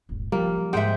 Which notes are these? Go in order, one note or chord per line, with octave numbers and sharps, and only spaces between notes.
D#1 G#1
C#3 F3 G3 A#3
D#3 F#3
G#2 G#3 C5 E5 F#5 G5